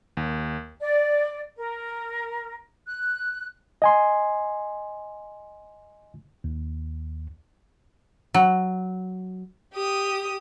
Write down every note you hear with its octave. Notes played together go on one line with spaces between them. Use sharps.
D#2
D5
A#4
F#6
D#5 G#5 C6
D#2
F#3
G4 D#6